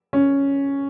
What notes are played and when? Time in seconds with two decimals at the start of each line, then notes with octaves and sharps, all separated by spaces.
0.13 C#4